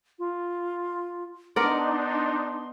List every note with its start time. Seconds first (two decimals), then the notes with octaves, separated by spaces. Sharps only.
0.19 F4
1.56 B3 D4 D#4 A#4 D5 C6